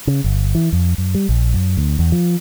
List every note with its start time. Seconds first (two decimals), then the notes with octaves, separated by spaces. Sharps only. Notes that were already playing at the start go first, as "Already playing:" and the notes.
0.07 C#3
0.24 G1
0.55 E3
0.73 F2
0.98 F#2
1.14 G3
1.29 A#1
1.54 F#2
1.77 D2
1.99 E2
2.12 F3